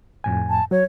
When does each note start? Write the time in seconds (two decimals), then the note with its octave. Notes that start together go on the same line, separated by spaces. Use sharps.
0.24 F2 A2 G#5
0.50 A5
0.71 F#3 C#5